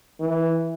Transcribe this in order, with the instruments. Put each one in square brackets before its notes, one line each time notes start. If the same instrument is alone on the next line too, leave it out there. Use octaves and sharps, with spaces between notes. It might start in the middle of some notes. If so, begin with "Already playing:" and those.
[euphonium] E3